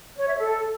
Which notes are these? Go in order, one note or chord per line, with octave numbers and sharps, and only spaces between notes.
C#5
E5
A4